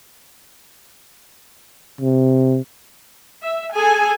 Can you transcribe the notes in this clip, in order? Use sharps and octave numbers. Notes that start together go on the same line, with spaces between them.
C3
E5
G#4 A4 G#5